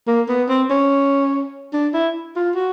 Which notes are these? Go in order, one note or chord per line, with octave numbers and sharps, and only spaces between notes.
A#3
B3
C4
C#4
D4
E4
F4
F#4